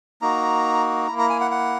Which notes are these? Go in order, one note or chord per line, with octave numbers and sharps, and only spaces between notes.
A#3 D#4 F#4 A#5
A#3 E4 A#5
A#5
G#5
F#5
F#5